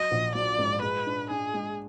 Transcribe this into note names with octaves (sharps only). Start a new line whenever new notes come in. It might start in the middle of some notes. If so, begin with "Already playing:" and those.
Already playing: F#3 D#5
A#1
F#3 D5
G#2
G#3 B4
D4
D4 G#4
G#3